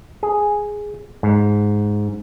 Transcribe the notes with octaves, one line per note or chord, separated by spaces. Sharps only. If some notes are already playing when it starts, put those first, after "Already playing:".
G#4
G#2